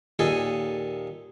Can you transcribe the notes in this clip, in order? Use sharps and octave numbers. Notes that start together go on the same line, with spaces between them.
D#2 A#2 G#4 A4 D#5